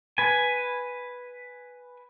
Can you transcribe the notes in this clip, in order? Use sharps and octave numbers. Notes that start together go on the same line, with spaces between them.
B4 G#5